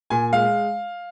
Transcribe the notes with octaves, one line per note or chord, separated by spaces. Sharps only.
A#2 G#5
G#3 F5